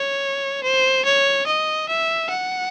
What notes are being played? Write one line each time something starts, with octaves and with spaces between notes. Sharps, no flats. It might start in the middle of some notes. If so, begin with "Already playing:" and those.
Already playing: C#5
C5
C#5
D#5
E5
F#5